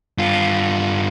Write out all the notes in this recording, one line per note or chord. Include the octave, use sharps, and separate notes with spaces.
G2 F4